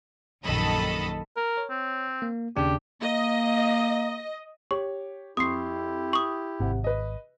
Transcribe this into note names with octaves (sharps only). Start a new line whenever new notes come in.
A#1 F#2 D#3 A4 D#5 B5
A#4
C#5
C4
A#3
D#2 C#3 D4 G4
A#3 D#5
G4 C#5 C#6
F2 E4 G4 C6 C#6 D#6 C7
C#6 D#6
G#1 C3 F#5
B4 D#5